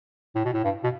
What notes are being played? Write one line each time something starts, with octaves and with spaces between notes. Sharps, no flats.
A2
B2
A2
G2
B2